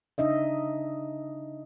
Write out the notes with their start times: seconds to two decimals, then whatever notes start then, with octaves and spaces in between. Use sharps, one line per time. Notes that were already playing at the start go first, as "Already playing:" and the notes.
0.18 C#3 D4 D#4 D#5 E5